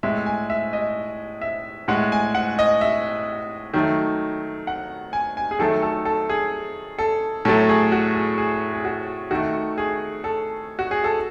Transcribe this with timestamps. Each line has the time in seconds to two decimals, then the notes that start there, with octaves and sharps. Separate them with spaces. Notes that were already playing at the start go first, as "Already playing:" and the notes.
0.03 A2 G#3 E5
0.26 G#5
0.50 E5
0.73 D#5
1.41 E5
1.88 A2 G#3 F#5
2.12 G#5
2.35 F#5
2.59 D#5
2.81 E5
3.74 D#3 F#3 A3
4.67 F#5
5.13 G#5
5.37 G#5
5.51 G#4
5.59 D#3 F#3 A3 A4
5.82 A4
6.05 A4
6.29 G#4
6.98 A4
7.45 A2 F#3 A3 A4
7.69 G#4
7.92 F#4
8.15 G#4
8.38 G#4
8.74 G#4
8.85 F#4
9.31 D#3 A3 F#4
9.78 G#4
10.24 A4
10.79 F#4
10.91 G#4
11.04 A4